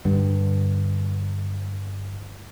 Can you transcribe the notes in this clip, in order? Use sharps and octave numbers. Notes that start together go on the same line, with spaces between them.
G2 D3